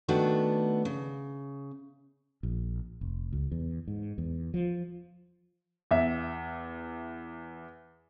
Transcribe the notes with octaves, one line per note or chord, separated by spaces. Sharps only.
D#3 A3 B3 D4 F#4
C#3
A#1
F1
C#2
E2
G#2
E2
F3
E2 E5